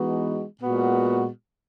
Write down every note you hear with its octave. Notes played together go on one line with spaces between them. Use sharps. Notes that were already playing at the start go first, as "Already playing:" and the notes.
Already playing: E3 G#3 B3 D#4 F#4
A#2 G#3 B3 F#4